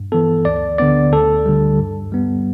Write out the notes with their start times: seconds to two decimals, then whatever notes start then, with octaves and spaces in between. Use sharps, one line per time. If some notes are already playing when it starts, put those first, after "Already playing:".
Already playing: G2
0.12 E3 B3 A4
0.45 D2 D5
0.78 D3 B3 D5
1.12 D2 A4
1.46 D3 G3
1.79 G2
2.12 G3 B3